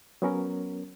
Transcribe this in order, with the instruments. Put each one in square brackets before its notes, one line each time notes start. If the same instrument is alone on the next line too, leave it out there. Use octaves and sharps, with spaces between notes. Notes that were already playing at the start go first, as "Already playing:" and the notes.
[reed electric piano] F#3 B3 C#4 A#4